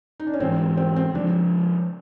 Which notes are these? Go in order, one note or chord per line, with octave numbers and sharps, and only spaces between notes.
D#4
D4
C#4
G#2 E3 G#3 C4
C4
C4
C#3 F3 G#3 D4